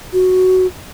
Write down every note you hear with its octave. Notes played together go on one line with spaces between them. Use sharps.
F#4